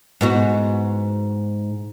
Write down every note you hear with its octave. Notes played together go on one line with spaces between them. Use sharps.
G#2 B3 F#4